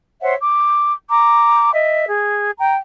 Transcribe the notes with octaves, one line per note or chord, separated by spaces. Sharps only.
C5 C#5 E5 F#5
D6
A#5 D6
D#5 E5
G#4
G5 A#5